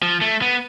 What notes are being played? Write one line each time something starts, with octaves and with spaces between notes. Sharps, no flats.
F3
A3
B3